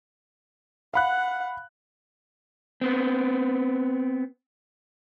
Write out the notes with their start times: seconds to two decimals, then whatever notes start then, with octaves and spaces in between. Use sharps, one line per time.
0.94 F5 F#5 B5 F#6
2.81 B3 C4